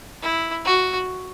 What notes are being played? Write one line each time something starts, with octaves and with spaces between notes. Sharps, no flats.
E4
F#4